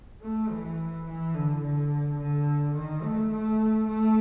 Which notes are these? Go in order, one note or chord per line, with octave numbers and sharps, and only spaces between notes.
A3
E3
E3
D3
D3
D3
D#3
A3
A3
A3